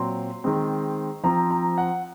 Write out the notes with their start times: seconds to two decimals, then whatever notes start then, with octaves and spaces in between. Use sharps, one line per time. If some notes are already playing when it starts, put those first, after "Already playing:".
Already playing: A#2 F#3 C4 C6
0.44 D#3 G#3 C4
1.24 F3 C4 A#5
1.51 A#5
1.78 F#5